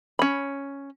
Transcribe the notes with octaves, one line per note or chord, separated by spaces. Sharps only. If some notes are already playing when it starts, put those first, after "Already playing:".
C#4 B5